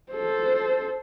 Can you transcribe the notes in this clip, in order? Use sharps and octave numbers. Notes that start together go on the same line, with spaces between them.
A4 C5